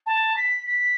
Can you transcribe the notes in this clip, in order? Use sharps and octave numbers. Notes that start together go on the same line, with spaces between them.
A5
B6
B6